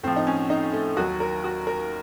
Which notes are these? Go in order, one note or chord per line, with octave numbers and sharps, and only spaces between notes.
A2 F3 C4
D#4
C#4
D#4
A3
D#2 D#3 F#3 F#4
A#4
F#4
A#4